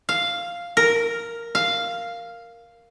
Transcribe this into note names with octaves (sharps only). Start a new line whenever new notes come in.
F5
A#4
F5